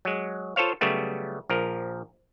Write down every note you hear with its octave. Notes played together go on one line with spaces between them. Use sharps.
F#3 G#3
F4 A4 C5 C#5 F5
C#3 F#3 G3 A3 B3
A#1 F3 A#4